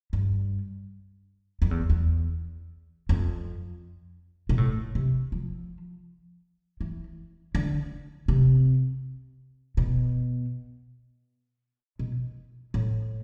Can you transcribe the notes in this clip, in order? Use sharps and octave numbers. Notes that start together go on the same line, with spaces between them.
G2
F2
E2
E2
F2
B2
A2
C3
F3
E3
D3
C3
B2
B2
A2